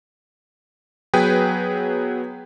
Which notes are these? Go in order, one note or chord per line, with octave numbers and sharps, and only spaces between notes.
F#3 B3 G#4 B4 G5